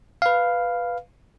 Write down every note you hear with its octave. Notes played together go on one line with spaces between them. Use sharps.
B4 F5